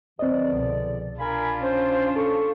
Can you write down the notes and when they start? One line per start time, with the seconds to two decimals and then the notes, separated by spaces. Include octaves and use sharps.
0.19 E2 D3 F3 C4 D5 D#5
0.53 C2 B2
1.19 D4 F4 A#4 F5 G#5 B5
1.61 C#4 C5
2.16 A4 C#6